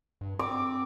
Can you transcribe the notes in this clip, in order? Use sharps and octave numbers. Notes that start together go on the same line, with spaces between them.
G2
C4 D6